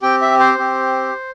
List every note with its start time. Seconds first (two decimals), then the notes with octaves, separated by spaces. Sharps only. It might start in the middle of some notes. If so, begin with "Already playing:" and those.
0.02 C4 G4 G5
0.22 E5
0.40 C5
0.58 C4 G4